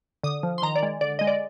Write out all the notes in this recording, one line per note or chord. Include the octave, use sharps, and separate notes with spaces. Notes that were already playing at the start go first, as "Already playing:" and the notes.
D3 D#6
F3
C6
D#3 A#5
D5
G#3
D3 D5
G#3 D#5
D5